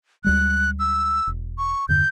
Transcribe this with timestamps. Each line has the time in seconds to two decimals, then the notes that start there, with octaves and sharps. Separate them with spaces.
0.24 D2 G3 G#3 F#6
0.80 E6
1.27 E1
1.58 C#6
1.89 E2 G2 D3 G6